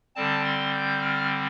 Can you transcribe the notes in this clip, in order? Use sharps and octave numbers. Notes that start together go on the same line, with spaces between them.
D3 G3 C4 A5
C6
G6
F6